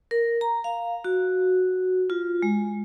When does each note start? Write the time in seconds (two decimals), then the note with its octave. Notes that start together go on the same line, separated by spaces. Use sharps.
0.11 A#4
0.41 A#5
0.64 F5
1.04 F#4
2.10 F4
2.42 G#3